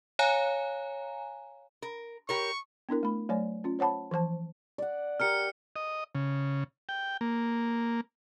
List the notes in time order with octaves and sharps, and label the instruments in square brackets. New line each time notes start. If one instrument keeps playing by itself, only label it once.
[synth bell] C#5 F5 G#5 A#5
[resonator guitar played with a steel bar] A#4
[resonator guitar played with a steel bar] G4 A#4 C#5 [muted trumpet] C#6
[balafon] B3 D4 E4 A#4
A3 B5
F#3 A3 C#5 D5 G#5
C#4 F4
C5 C#5 F#5 A5 B5
E3 F3 C5 A5
[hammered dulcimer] D5 F#5
[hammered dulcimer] G4 A#4 F#5 [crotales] F6 C#7
[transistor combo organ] D#5
C#3
G5
A#3